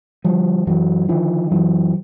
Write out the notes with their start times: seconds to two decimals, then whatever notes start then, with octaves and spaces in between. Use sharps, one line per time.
0.24 D3 F3 G3
0.67 F#2 E3 F#3
1.09 D3 D#3 F3
1.51 F#2 E3 F#3